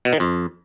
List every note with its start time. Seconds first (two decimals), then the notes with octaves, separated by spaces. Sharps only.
0.05 B2
0.13 D#3
0.20 F2